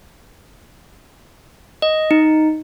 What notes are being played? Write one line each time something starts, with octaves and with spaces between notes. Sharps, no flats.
D#5
D#4